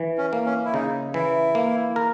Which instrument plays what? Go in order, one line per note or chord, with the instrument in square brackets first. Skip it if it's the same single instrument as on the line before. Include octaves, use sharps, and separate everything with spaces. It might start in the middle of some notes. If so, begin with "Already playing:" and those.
Already playing: [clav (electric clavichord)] E3
[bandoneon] C#4
[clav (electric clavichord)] A#3
[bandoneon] C#4
E4
[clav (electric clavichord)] C#3 [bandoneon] D#4
[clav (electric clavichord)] E3 [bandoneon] E4
[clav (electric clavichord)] A#3
A#4